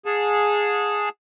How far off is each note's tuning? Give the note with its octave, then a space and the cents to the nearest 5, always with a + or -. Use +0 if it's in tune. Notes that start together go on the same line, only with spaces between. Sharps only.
G#4 +0 F#5 -40 A5 +0